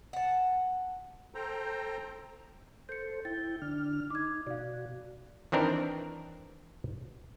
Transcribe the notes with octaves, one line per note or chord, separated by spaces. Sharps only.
F#5 A5
A4 C5 G5 A#5
A4 C5 G6 C#7
E4 G5 A6
D3 D4 F6
D#4 D6 G#6
B2 F#4 D5 F5
D#3 E3 C4 D4 A#4